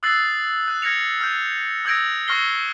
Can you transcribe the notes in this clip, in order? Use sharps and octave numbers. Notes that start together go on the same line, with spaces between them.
D#6 E6 F#6 A6 C7 F#7
F#6
F6 G#6 A#6 C#7 F7
F6 G6
D#6 E6 G6 G#6 A#6 D7
C#6 F6 F#6 A#6 C7 G7